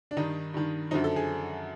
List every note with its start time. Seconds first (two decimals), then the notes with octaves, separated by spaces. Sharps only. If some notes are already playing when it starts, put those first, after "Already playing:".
0.11 D4
0.17 G2 D#3 D#4
0.54 G2 D#3
0.91 F#2 D3 F3 D#4
1.04 A4
1.16 G#4